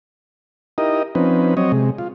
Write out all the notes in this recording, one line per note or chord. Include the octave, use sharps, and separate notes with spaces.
D#4 E4 G4 A#4 D#5
F3 C4 C#4 D#4 B4
F#3 C4 C#5 D#5
C3 G#3
F4